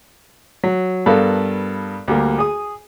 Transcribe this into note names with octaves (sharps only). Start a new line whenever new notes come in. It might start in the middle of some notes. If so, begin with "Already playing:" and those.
F#3
G2 B3 A4 A#4 F5
D2 G3 A#3
G#4 D#6